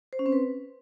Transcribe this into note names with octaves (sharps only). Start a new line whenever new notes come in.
C5
C#4
C4
B4